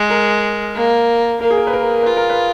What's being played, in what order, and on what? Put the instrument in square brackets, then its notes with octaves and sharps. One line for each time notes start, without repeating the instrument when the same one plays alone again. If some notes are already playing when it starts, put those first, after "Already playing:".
Already playing: [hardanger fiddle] G#3
[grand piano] A#4
[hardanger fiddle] A#3
[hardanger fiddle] A#3 [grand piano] A#4
[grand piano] G#4
A#4
B4
A#4
[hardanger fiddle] F4 [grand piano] B4
[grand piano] A#4
B4